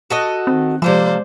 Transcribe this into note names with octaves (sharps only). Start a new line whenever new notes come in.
F#4 A4 D#5
D#3 C4
C3 F3 G#3 A#3 A4 C5 D5